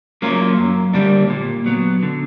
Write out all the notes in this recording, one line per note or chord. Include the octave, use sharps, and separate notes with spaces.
F#3 A#3 C#4 F4
F#2
D3 G3 A#3 D4
A#2
F#3 B3
D3